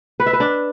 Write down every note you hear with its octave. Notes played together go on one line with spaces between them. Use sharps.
B4
E5
B4
D4